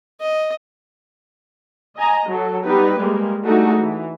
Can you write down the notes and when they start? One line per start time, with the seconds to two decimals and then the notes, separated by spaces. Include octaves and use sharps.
0.21 D#5
1.96 D#5 G#5 A#5
2.28 F#3 A4
2.63 G3 B3 D#4 G4 B4
2.97 G3 G#3 A#3
3.43 G3 A3 D4 D#4 F#4 G#4
3.80 E3